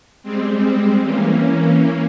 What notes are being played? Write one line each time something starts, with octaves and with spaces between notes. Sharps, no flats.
G3 G#3 C4
E3 A#3 C#4